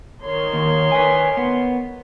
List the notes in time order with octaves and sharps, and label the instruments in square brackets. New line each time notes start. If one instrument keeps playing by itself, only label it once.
[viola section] D#3 C#5 C6
[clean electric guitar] D#2
B4 G#5
B3